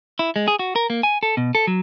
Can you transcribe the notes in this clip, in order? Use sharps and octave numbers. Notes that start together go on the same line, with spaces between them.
E4
G#3
G#4
F#4
A#4
A#3
G#5
A4
B2
A4
F#3